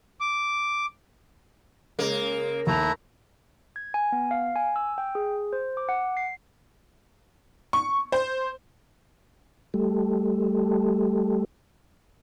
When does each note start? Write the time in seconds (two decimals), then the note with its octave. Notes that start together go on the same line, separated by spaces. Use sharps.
0.21 D6
1.99 C#3 G#3 A#3
2.67 D#2 A3 E4 A#5 F7
3.76 G#6
3.94 G#5
4.12 B3
4.31 F5
4.56 G#5
4.76 E6
4.98 G5
5.15 G#4
5.53 C5
5.77 D6
5.89 F#5
6.17 C7
7.73 C#6
8.12 C5
9.74 G3 A3